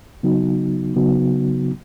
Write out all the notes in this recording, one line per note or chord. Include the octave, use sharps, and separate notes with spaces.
C#3 F#3 B3 D#4 F#4
C#3 F#3 B3 D#4 F#4